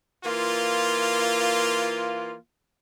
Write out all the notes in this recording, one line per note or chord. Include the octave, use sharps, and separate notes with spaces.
E3 A#3 F4